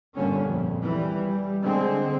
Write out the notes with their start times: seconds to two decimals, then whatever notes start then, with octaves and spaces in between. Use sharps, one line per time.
0.15 G1 A#2 D3 G3 C#4
0.46 A#1 F2
0.83 E3 G3
1.27 G3
1.62 D3 G#3 C4